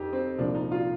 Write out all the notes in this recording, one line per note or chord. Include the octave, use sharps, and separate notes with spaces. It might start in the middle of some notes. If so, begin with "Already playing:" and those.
Already playing: F2 D#3 D#4 G4
C4
C2 A#2 F3 D4
D#4
F4